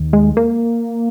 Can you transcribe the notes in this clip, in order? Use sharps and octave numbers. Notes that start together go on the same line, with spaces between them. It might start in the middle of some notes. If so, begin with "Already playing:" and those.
Already playing: D#2 D#3
G#3
A#3